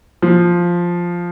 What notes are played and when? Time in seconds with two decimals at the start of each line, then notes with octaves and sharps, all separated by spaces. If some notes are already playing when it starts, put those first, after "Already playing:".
0.22 F3